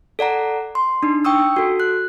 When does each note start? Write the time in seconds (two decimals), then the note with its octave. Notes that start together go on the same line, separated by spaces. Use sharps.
0.19 A4 D5 F#5 A#5
0.75 C6
1.03 D4 D#4
1.25 G5 C#6 D#6 E6
1.56 F#4 A4
1.80 F#6